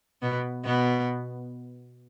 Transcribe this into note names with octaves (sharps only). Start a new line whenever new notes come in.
B2 B3
B2 B3